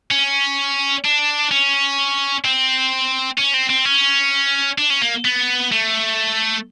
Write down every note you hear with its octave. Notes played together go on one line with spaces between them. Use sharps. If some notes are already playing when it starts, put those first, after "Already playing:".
C#4
D4
C#4
C4
C#4
C4
C4
C#4
D4
C#4
A#3
B3
A3